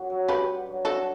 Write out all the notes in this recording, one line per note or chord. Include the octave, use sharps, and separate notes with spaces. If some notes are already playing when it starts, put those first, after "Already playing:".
Already playing: F#2 F#4
F#3
G2 G4 B4
D3
F#3
D3 F#4 A4